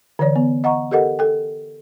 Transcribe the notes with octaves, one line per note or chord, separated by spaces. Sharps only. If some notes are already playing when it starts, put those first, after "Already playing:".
D3 E3 C#5 D5
B3
D#5 F#5 A#5 C#6
G4 A4 A#4 D#5 F#5
A4 G5